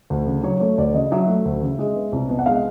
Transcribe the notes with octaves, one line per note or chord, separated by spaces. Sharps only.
D2
C#3
F#3 C#5
A3 C#5
D2 D5
C#3 D#5
F#3 E5
A3
D2
C#3
G#3
B3
C2
B2
F#5
G#3 F5